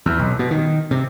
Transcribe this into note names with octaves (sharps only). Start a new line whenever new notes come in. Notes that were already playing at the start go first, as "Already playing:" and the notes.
E2
B1
B2
D#3
C3